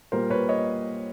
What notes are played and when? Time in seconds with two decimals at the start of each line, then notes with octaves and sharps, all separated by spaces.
0.12 A#2 G3 A#3 A#4 C5
0.30 B4 C#5
0.49 C#5 D#5